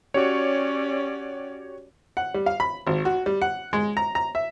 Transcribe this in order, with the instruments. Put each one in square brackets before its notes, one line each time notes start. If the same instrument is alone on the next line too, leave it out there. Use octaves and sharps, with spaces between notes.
[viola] C#4 D5 [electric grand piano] F#4 G4 C#5
[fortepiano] F#5
G3
F5
B5
G#1
F#4
G3
F#5
G#3
A#5
A#5
E5